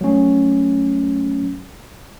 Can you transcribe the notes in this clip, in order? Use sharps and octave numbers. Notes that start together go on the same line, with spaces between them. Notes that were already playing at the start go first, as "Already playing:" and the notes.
F#3 A3 C#4